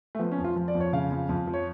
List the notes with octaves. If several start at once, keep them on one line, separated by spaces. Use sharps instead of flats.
A3
F3 B3
C#4
F2
F4
F3
D5
F2
C#5
C#3 F5
F2
F2
F3
C#5